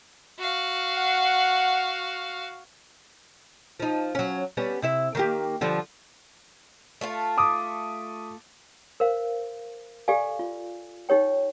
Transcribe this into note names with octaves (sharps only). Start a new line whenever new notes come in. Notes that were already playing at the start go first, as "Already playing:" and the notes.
F#4 F5
F#5
F3 D#4
F#3 C#4
G3 B3 C#4
C3 E4 E5
D#3 A#3 G4
D3 F3 G3
A3 F4 F5
D6 D#6
A#4 C5 F5
G4 A4 D5 F5 G#5
F4
D#4 G4 C#5 G5